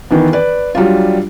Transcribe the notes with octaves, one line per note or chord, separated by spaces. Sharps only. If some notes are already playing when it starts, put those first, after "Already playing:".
D#3 E3 B3
B4 D5
F#3 G3 D4 F4